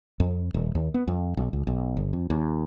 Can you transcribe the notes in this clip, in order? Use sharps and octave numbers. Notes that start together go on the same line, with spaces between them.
F2
D#1
D#2
B3
F2
B1
C#2
B1
G1
F2
D#2